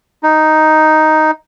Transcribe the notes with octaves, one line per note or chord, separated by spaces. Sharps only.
D#4